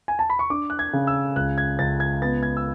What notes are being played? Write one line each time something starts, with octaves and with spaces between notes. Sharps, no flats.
G#5
A5
B5
C#6
D4 D6
F#6
G#6
C#3
E6
C#2 F#6
G#6
C#2 A6
G#6
B3 A6
G#6
E6